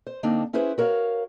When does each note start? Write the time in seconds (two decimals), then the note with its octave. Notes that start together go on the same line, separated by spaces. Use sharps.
0.07 C5
0.23 D3 A#3 C4 D4 D#4
0.53 C#4 E4 G#4 B4 C5
0.78 F#4 A#4 C#5 E5 F5